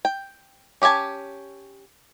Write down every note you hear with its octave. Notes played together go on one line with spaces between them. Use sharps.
G5
C#4 G4 D#5 G#5 A5